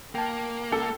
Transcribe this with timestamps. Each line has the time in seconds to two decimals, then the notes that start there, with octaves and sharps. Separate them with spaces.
0.15 A#3 G5 A5
0.71 C#2 A4